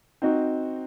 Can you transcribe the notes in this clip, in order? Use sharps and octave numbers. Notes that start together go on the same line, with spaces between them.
C4 D#4 F#4